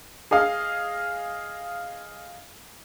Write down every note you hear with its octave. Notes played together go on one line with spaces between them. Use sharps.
G#4 D#5 F5